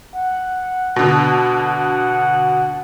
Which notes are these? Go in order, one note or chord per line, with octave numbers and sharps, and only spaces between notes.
F#5
B2 D3